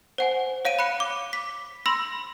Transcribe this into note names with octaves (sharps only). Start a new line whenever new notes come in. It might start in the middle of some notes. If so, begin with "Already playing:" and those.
C5 F#5 G#5
C#5 F5 D7 D#7
B5 F#6 C#7
D6
B6
B5 C6 E6 A#6